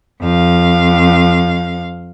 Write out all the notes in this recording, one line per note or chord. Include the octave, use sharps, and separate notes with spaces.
F2 F5